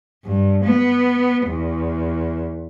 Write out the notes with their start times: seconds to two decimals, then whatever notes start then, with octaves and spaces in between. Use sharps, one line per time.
0.24 G2
0.64 B3
1.47 E2